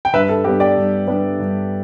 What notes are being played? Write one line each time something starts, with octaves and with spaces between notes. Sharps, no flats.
G5
G2 B4 E5
A4
G3 B3 D4 G4 B4
D5 G5
G2
G3 B3 D4
G2